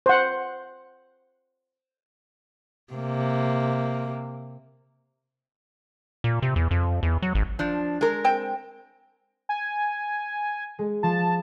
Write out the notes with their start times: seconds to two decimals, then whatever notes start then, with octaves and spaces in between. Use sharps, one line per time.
0.06 C5 F#5
2.93 C3 A#3
6.24 A#2
6.42 C3
6.56 E2
6.71 F2
7.03 E2
7.22 F#3
7.35 G#1
7.59 F3 D4
8.01 G#3 A#4
8.25 C4 G5
9.49 G#5
10.79 G#3
11.03 F3 A5 E7